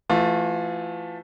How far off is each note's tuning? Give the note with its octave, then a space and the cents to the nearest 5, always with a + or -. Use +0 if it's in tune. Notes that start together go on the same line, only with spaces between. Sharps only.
E3 +30 A3 +0 F4 +30